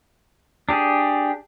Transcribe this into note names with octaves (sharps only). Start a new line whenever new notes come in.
D4 G4 G#4